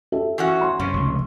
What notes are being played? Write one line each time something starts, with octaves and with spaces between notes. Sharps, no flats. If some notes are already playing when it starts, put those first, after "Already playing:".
G4 A4 E5
E3 C#4 F#4
B5 C6
F#2 C3 C#4
F1 C#2